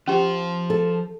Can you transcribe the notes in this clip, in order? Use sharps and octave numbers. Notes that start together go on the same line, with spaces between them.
F3 C#4 G4 C5
A4